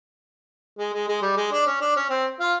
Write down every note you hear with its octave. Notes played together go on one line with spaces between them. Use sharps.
G#3
G#3
G#3
G3
G#3
D4
C#4
D4
C#4
C4
F4